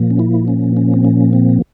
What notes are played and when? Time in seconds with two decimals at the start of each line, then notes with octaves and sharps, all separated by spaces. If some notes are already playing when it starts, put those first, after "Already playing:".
Already playing: A#2 F3 A#3
0.10 C#4
0.19 E4
0.48 C#4
0.77 C#4
0.94 C4
1.05 C#4
1.33 C4